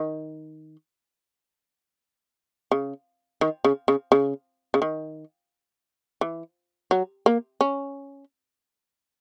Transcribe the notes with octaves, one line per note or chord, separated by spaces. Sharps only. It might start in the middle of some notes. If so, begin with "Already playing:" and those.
Already playing: D#3
C#3
D#3
C#3
C#3
C#3
C#3
D#3
E3
F#3
A#3
C#4